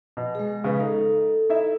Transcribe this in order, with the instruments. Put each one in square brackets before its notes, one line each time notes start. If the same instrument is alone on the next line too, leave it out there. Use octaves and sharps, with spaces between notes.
[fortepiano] B2
[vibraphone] G#3 G#4
[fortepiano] C#3 B3
[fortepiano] D#4 [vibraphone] A4
[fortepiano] D#4 E4 E5